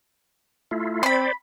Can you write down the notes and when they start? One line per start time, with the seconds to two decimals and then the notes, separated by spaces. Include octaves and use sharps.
0.71 A3 E4 F4
1.03 C4 C5 D5 B5 C6